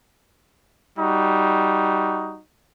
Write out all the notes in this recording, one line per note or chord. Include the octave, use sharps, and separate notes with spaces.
G3 D#4 F#4